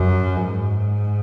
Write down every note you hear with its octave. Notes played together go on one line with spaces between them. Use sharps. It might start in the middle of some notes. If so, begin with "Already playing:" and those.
Already playing: F#2
G#2